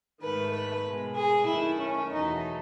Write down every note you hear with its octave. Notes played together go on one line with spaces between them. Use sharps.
G#2 D#3 A3 B4
B4
B2 G#3
G#4
F#2 D#3 A3 E4
C#4
E2 B2 F#3 A3 D#4